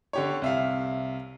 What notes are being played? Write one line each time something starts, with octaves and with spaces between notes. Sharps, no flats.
D3 G4 C#5
C2 E5 F5